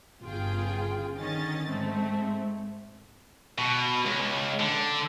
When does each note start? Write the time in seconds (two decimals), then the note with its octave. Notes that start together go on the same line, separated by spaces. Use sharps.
0.21 G1 C#3 F4 G#4 G5
1.16 D3 D#3 C#4 D#5 A6
1.68 G#2 G#3 A3 C4
3.58 B2
4.06 C#2
4.59 D3